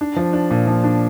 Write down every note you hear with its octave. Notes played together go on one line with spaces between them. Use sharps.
D4
F3
D4
A#2
F3
D4